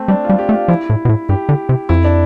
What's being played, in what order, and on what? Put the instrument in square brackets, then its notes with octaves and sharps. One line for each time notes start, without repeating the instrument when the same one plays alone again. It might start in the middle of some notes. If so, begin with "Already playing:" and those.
Already playing: [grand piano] A3 C4
[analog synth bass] G3 [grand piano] D4
[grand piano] F4
[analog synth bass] G3
[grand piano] G4
[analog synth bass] A3
[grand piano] F4
[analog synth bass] F3 [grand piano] E4
[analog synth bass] A2
B2
A2
[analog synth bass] G2 [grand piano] G4
[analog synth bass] D3
C3
[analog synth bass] F2 [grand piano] E4
[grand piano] D4